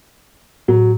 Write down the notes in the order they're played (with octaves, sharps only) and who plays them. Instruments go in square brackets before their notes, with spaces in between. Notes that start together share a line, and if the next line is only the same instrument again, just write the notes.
[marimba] A2 [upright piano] F#3